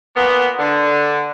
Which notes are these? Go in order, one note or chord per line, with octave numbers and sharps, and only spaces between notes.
A#2 A#3 B3
D3